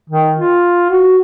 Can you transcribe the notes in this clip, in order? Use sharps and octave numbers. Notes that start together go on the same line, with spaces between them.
D#3
F4
F#4